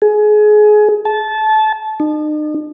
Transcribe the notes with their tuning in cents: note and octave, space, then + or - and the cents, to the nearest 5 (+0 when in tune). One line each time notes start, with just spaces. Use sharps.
G#4 +25
A5 -20
D#4 -40